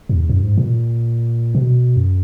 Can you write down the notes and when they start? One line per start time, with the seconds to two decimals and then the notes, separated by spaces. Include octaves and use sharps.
0.09 F#2
0.15 E2
0.29 F#2
0.43 G#2
0.58 A#2
1.55 B2
1.96 F#2